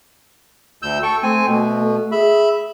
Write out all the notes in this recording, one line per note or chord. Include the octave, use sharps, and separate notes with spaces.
D2 E6 G6
A4 G5 C#6
A3 C4 G#5
B2 A3
G#4 E5 B5